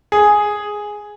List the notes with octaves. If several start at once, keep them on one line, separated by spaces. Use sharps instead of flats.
G#4